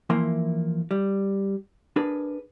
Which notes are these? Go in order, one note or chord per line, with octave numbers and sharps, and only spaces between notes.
E3 F3 A#3 E4 A#4 C6
G3
D4 G#4 A#4 B4